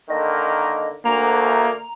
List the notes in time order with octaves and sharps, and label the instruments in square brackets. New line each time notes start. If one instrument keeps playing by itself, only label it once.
[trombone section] D3 D#3 A#3 [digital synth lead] D#5
[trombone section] D2 [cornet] A#3 [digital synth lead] A#5